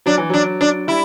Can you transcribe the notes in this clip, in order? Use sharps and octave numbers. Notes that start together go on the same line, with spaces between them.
F#3 D4
E3
F#3 D4
D4
G3 E4